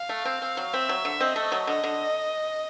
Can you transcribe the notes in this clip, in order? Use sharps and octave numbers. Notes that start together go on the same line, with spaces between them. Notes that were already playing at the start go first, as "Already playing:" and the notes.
Already playing: F5
A3
C4
C4
F#3
C4 E5
F#3
D3
C4 D#5
A3
F#3
D3 D#5
D3